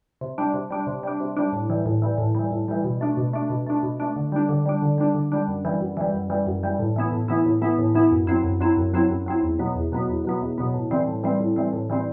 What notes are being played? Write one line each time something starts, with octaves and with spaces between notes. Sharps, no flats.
C3
G3 D4
C3
G3 D4
C3
G3 D4
C3
G3 D4
A2
E3 G3
A2
E3 G3
A2
E3 G3
A2
E3 G3
B2
A3 D4
B2
A3 D4
B2
A3 D4
B2
A3 D4
D3
G3 D4
D3
G3 D4
D3
G3 D4
D3
G3 D4
F#2
E3 G3
F#2
E3 G3
F#2
E3 G3
F#2
E3 G3
A2
E3 B3 E4
A2
E3 B3 E4
A2
E3 B3 E4
A2
E3 B3 E4
F#2
F#3 C4 E4
F#2
F#3 C4 E4
F#2
F#3 C4 E4
F#2
F#3 C4 E4
E2
B2 F#3 B3
E2
B2 F#3 B3
E2
B2 F#3 B3
E2
B2 F#3 B3
A2
E3 G3 C4
A2
E3 G3 C4
A2
E3 G3 C4
A2
E3 G3 C4